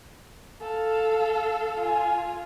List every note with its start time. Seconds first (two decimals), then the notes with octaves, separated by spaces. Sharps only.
0.61 A4 F5
1.79 F4 G#5